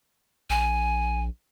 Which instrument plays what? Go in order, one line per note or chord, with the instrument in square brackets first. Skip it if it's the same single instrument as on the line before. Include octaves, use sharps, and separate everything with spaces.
[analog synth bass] A#1 [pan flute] G#5